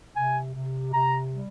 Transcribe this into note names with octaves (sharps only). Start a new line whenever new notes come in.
C3 G#5
C3
C3 A#5
G3